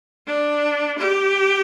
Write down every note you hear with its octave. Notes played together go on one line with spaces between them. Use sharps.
D4
G4